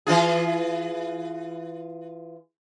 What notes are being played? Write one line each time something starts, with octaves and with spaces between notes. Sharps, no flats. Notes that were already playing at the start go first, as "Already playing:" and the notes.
E3 F4 G#4